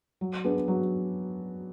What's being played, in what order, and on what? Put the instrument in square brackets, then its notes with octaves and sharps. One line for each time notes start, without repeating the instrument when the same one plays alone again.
[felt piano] F#3
B3 D4 G#4 B4
F#3